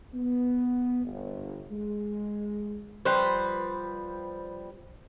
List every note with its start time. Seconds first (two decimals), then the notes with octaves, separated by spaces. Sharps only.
0.14 B3
1.05 G1
1.71 G#3
3.05 F3 G3 B4 C5